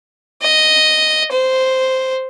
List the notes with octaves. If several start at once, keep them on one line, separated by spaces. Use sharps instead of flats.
D#5
C5